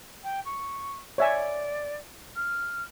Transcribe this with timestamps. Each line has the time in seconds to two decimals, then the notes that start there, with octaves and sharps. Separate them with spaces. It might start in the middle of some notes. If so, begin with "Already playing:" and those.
0.23 G5
0.45 C#6
1.18 C#5 D5 E5 G#5
2.36 F6